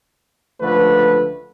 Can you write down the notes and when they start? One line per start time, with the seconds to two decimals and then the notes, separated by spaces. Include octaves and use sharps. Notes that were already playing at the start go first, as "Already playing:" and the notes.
0.60 C#2 D3 F3 A3 B4